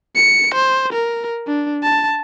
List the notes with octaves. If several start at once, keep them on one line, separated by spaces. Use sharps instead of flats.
C#7
C5
A#4
D4
A5